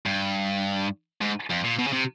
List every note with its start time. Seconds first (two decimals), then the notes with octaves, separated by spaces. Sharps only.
0.06 G2
1.21 G#2
1.50 F2
1.64 A#2
1.79 B2
1.87 C#3
1.93 C3